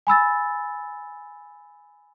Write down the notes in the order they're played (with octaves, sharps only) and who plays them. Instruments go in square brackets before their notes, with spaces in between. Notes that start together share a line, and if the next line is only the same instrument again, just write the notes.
[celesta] G#5 B5 E6 A6